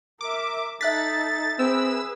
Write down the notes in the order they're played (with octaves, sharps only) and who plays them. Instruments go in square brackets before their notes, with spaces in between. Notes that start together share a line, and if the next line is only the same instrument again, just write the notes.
[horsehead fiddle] A#4 E5 [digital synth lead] D6
[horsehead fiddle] D#4 A4 [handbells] E5 F#6 B6 [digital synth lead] A6
[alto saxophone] C4 [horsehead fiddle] G#4 B4 [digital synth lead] E6